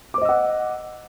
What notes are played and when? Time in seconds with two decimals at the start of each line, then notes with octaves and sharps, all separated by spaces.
0.14 D6
0.18 C5
0.22 D#5
0.25 E6
0.29 F#5